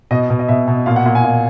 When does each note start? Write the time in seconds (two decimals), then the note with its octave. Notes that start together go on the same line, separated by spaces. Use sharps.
0.11 B2 D#5
0.30 B2
0.39 D#5
0.48 B2 E5
0.68 B2
0.86 A#2 F5
0.96 F#5
1.06 A#2
1.15 G#5
1.23 A#2